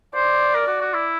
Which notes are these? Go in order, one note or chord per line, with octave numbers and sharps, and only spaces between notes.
C5 D5
A#4
F#4
F#4
E4